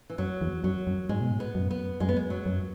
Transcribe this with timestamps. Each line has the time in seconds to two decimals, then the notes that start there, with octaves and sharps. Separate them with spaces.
0.10 E3
0.18 F#2 F#3
0.41 E2
0.64 F#2 F#3
0.87 F#2
1.09 G#2 G#3
1.21 B2
1.32 G#2
1.40 B3
1.55 F#2
1.71 B3
2.00 F#2 G#3
2.09 B3
2.16 G#3
2.30 F#3
2.46 F#2